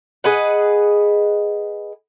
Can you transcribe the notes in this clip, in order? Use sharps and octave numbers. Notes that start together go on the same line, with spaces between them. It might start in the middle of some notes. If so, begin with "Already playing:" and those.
G#4 B4 D#5 F#5